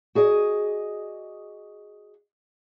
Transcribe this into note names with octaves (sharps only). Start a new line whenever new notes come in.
F#4 G#4 D5 D#5